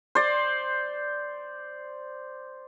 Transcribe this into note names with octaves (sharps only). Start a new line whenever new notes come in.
C5 D5